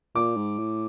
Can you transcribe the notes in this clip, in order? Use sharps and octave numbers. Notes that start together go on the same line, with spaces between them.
A#2 D6
G#2
A2